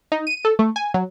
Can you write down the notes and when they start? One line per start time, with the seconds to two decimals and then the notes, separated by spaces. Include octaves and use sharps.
0.12 D#4
0.27 D#7
0.45 A4
0.59 A3
0.76 G#5
0.94 F#3